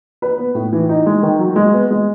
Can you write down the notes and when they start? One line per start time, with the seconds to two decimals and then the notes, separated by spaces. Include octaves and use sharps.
0.22 B4
0.38 B3
0.55 A2
0.73 E3
0.89 D#4
1.06 G#3
1.23 D#3
1.39 F#3
1.56 G#3
1.73 B3
1.91 G#3